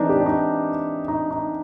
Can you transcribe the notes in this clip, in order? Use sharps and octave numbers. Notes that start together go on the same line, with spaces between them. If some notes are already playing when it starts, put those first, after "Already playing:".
Already playing: E3 G#3 C4 D4 D#4
G4
D4
D#4
D#4
D#4